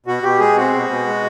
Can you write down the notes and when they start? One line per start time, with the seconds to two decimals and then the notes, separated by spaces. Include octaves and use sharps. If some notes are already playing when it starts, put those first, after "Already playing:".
0.06 B2 F#4
0.23 B2 G4
0.39 G#3 G#4
0.57 C4 F#4
0.74 B2
0.89 B2
1.06 G#3